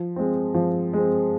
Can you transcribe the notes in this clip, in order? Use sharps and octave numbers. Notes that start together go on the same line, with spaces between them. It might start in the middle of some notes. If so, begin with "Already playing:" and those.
Already playing: F3
G#3 C4
F3
G#3 C4